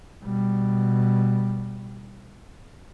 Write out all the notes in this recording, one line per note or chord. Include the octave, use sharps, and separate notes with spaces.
B2 G3